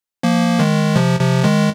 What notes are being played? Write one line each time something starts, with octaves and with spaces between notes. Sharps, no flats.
F3 A#3
D#3 G#3
C3 F3
C3 F3
D#3 G#3